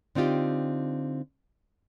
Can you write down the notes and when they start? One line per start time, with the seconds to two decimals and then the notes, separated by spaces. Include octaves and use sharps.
0.15 D3 C4 D#4 F4 G4